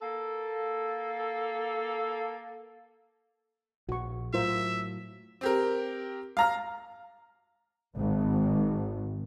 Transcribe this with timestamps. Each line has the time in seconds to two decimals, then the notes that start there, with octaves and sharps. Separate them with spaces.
0.01 A#3 A4
3.89 A#1 F#4 C#6
4.34 A2 F#3 F4 A#4 C5 E5
5.41 C4 G4 A#4
6.37 F5 A#5 F6
7.95 G#1